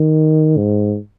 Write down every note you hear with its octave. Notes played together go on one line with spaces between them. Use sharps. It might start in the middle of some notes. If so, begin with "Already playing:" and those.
Already playing: D#3
G#2